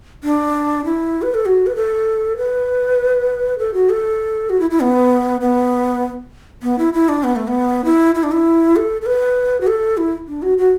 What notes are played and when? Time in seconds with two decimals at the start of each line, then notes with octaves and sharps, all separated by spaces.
0.24 D4
0.85 E4
1.22 B4
1.34 A4
1.46 F#4
1.66 B4
1.76 A4
2.37 B4
3.58 A4
3.74 F#4
3.90 A4
4.50 F#4
4.60 E4
4.70 E4
4.80 B3
5.41 B3
6.63 B3
6.79 E4
6.94 E4
7.09 D4
7.24 B3
7.36 A3
7.48 B3
7.85 E4
8.15 E4
8.23 D4
8.32 E4
8.76 A4
9.02 A4
9.06 B4
9.61 F#4
9.67 A4
9.97 E4
10.28 D4
10.42 F#4
10.58 F#4